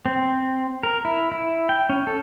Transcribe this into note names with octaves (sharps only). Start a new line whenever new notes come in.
C4
A#4
E4
E4
G5
C#4
A4